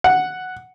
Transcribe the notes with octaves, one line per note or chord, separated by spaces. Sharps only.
F#5